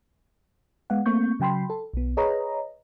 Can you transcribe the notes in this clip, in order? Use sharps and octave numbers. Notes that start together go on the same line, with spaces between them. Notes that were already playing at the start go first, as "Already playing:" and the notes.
G#3 B3 F5 F#5
A3 A#3 C4 C#6 G6
C#3 F#3 G5 B5 C6
A4
B1 B3
G#4 B4 C#5 D#5 A#5